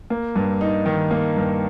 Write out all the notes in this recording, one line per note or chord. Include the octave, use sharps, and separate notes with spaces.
A#3
G2
D#4
D#3
A#3
G2